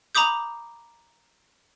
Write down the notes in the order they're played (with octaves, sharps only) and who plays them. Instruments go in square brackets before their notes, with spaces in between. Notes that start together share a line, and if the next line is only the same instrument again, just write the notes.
[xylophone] A#5 B5 D6 D#6 G6